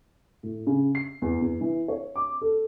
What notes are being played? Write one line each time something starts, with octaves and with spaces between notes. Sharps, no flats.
A2
C#3
C7
E2
E2
E3
C#5
D6
A4